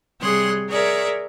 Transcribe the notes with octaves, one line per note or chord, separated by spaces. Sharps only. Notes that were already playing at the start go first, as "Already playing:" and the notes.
C3 G3 G#4 C#5 C6 F#6
G#4 A#4 C#5 D5 E5